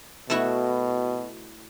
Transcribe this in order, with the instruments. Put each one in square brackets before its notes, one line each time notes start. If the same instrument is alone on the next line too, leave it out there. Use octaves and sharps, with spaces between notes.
[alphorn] B2 [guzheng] A3 E4 F#4